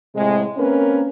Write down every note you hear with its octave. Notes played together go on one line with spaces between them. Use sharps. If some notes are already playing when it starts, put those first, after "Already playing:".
A2 C3 G#3
A#3 C4 C#4 A#4 B4